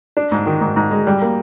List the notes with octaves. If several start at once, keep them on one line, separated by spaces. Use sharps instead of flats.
D4
G#2
D#3
G#2
G#2
G#3
G3
A#3